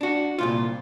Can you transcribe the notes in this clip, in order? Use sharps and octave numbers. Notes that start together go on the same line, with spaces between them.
D4 F#4
C2 A#2 F4